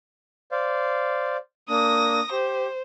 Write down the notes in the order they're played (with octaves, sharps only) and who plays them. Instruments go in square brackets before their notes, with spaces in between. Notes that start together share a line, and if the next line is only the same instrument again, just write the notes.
[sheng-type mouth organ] C5 D5 F5
[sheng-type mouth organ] A#3 D4 [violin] D#6 A#6
[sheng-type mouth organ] G4 [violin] C5